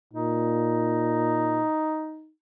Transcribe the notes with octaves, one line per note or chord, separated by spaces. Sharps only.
A#2 D#4